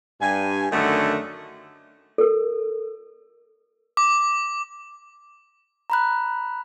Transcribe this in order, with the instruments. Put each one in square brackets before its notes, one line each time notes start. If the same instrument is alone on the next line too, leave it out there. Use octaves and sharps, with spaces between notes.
[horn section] G2 G#5
F#2 D3 D#3 A3 D#5 F#5
[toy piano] A4 A#4
[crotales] D6
[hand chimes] A#5 B5 F#6